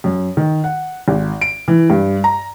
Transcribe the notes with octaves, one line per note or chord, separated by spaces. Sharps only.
F#2
D#3
F#5
G#1
D7
E3
G2
A#5